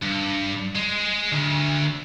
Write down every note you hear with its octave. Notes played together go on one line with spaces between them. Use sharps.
G2
G#3
D2